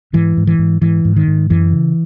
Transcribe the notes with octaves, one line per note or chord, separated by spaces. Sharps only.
G#2 E3
G#2
E3
G#2
G#2 E3
G#2
D#3
G#2
F#2 E3
C#3